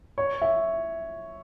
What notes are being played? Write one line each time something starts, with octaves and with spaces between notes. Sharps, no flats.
C#5
E5